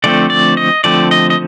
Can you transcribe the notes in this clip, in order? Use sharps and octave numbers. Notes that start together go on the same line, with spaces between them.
D3 F3 A3 C4 D5
D5
D#5
D3 F3 A3 C4 D5
D#5
D#5